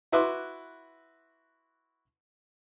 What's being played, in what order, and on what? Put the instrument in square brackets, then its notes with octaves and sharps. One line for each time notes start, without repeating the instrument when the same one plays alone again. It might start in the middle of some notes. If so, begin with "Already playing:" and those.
[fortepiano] E4 F#4 B4 E5 C6 D6